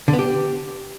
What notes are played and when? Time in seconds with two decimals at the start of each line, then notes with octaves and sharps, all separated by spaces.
0.08 D3
0.13 B3
0.19 G4